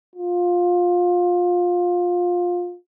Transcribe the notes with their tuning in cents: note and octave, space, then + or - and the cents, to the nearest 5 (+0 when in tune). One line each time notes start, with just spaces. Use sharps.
F4 +20